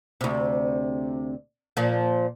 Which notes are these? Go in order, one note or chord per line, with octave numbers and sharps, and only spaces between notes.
D2 C3
A#2 F3